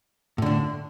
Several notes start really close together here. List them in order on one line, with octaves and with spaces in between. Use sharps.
A2 D3 D4